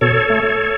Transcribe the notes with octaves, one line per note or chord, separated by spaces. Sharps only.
B2 A4 C#5
A3